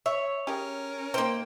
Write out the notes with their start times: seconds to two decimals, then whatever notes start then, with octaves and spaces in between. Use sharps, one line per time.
0.06 C#5 E5
0.47 C#4 G4 G#4 A#4
1.14 D#3 A#3 C5 G5